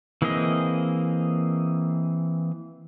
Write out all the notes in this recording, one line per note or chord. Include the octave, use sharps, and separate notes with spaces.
E3 A#3 C4 G#4 D#5